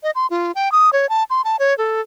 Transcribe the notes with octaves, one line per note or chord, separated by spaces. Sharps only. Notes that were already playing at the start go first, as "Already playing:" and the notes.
D#5
C6
F4
G5
D#6
C#5
A5
C6
A5
C#5
A4